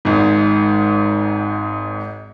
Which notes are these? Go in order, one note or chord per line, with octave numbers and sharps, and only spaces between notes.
G#1 G#2